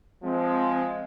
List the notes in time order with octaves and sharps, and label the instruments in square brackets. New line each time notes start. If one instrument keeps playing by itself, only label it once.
[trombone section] F3 G#3 [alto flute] C4